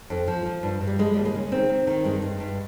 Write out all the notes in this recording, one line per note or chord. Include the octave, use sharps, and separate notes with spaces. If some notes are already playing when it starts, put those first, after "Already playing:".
F2
F3
F3
G2
G2
G3
F3 G#3
D#2 G3
G#3
C#3
D#3 C4
D#3
D#3
G2 G#3
G2
G2